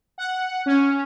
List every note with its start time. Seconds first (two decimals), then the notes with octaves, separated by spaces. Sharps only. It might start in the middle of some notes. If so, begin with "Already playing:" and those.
0.18 F#5
0.66 C#4